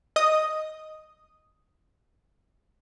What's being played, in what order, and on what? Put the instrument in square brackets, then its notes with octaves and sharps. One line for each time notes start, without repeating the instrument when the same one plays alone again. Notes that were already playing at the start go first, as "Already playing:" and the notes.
[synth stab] D#5 D#6